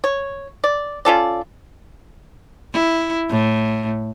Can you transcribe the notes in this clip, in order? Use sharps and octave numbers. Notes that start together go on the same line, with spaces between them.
C#5
D5
C#4 F4 A4 D5
E4
A2